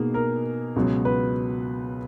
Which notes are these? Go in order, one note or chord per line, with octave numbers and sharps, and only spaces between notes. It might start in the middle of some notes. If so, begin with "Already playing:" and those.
Already playing: B2 A#3 D#4 G#4
A#4
C#2 B2 F#3
B4